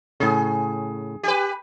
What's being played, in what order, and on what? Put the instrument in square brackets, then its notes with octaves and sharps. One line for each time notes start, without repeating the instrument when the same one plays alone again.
[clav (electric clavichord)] A2 C#3 [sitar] G#4
[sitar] G4 B4